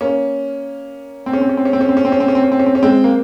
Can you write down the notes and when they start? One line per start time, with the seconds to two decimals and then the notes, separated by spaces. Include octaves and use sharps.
0.01 A#3 C#4
1.26 C4
1.33 C#4
1.41 C4
1.49 C#4
1.57 C4
1.65 C#4
1.73 C4
1.81 C#4
1.89 C4
1.97 C#4
2.05 C4
2.12 C#4
2.20 C4
2.28 C#4
2.35 C4
2.44 C#4
2.52 C4
2.59 C#4
2.66 C4
2.75 C#4
2.83 G#3 C4
3.04 A#3